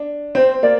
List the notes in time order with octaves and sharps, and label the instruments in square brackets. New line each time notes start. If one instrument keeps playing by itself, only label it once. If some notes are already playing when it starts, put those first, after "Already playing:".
Already playing: [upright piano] D4
[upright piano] C4 [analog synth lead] C5
[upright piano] A#3 [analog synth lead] D5